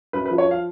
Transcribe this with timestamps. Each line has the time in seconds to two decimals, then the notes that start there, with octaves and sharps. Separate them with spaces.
0.13 F#2 B4
0.26 B4
0.31 F3
0.38 C#5
0.51 F5